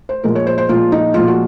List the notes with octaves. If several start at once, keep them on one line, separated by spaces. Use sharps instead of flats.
C5
A#2 F3 G#3 A#4
C#5
C5
C5
A#2 F3 G#3 F4
D#4
A#2 F3 G#3 F4
F#4